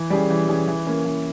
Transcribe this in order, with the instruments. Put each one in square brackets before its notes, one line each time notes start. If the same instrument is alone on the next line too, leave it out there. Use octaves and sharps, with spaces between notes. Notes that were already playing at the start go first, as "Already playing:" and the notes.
Already playing: [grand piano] E3
G3 C#4 G#4
E3
G3 C#4 G#4
E3
A#3 C#4
E3